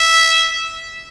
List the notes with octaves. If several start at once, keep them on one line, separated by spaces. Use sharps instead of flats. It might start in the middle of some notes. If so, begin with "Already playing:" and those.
Already playing: E5